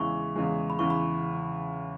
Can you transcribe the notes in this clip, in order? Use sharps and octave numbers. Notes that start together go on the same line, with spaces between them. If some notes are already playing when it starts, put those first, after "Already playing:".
Already playing: E2 C#3 E3 G#3 C#6
E2 C#3 E3 G#3
B5
E2 C#3 E3 C#6
B5